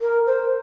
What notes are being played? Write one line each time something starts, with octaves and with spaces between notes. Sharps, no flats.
A#4
C5